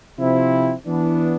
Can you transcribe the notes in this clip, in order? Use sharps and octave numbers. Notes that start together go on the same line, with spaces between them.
C3 F3 C4 E4
E3 B3 D4